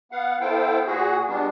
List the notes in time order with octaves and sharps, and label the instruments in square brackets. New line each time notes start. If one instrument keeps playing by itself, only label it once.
[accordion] B3 F5 F#5
B3 E4 A4 C5 F5 G5
A#2 F#4 G#4
G3 G#3 B3 D4